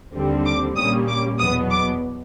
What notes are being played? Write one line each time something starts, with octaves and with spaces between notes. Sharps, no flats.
D#2 D3 G3 C4
D6
A#2 G3 A#3 C#4 D#6
D6
E2 B2 F#3 B3 D#6
D6